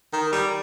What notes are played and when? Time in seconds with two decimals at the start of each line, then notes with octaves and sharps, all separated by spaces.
0.13 D#3
0.32 G3